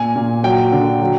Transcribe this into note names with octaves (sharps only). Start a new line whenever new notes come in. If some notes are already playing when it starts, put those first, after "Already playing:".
Already playing: A#2 G#5
A#2
F#3 G5
D3
F#3